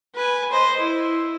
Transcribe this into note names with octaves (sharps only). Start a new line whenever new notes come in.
B4 G#5
C5 D#5
E4